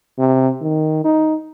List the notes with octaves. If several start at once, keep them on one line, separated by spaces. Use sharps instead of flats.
C3
D#3
D#4